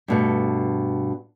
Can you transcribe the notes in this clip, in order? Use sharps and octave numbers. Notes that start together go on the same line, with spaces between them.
G2 B2 A3